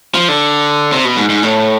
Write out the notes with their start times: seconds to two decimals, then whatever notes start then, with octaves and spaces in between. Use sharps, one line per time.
0.15 F3
0.29 D3
0.92 C3
1.05 B2
1.17 G#2
1.29 G#2
1.43 A2